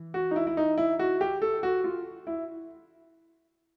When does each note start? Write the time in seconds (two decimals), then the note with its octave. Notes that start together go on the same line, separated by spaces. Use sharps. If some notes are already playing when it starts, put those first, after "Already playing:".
Already playing: E3
0.14 F#4
0.31 D#4
0.36 E4
0.47 E4
0.57 D#4
0.78 E4
0.99 F#4
1.21 G4
1.42 A4
1.63 F#4
1.84 F4
2.27 E4